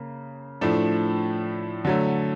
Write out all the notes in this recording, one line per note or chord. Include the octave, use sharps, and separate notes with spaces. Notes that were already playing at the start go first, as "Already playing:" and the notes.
Already playing: C#3 A#3
A2 F3 A3 D4
D3 F#3 A3